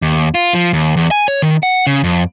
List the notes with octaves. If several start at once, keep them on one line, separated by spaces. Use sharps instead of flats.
D#2
F4
F3
D#2
E2
G#5
C#5
D#3
F#5
C#3
F2